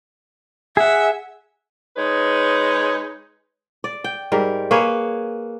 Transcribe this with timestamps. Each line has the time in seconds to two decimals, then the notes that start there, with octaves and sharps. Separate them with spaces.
0.77 G#4 E5 F#5
1.96 G#3 D#4 B4 C#5
3.84 D5
4.04 G5
4.32 G#2 G3 A#4
4.71 A#3 G#4 B4 C#5